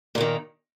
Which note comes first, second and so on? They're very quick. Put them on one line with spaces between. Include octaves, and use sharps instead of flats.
A#2 A#3 D#3